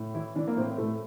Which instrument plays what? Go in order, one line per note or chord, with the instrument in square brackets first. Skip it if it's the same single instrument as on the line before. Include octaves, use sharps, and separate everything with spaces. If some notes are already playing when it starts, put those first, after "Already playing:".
Already playing: [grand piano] A2
E3 E4
E3 D4
A#3
A2 C4
A2 A3